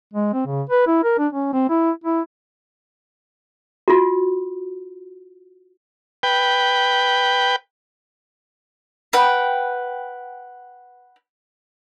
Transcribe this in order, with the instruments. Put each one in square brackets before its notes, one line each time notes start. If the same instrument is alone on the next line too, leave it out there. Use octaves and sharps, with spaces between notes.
[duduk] G#3
C4
C#3
B4
E4
A#4
D4
C#4
C4
E4
E4
[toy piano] F4 F#4
[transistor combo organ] B4 G5
[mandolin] B4 F#5 G5